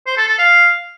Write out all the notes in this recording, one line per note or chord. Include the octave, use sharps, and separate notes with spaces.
C5
A4
A4
F5